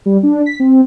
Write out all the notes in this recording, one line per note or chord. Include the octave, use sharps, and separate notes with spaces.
G3
D4
B6
C4